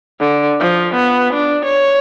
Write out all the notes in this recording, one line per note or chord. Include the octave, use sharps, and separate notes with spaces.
D3
F3
B3
D4
C#5